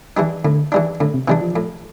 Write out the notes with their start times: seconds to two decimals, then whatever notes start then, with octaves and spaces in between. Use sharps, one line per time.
0.17 E3 G3 D4
0.44 A2 D3
0.72 E3 G3 D4
1.00 A2 D3
1.14 C3
1.28 C3 E3 G3 D4
1.41 F3
1.56 A2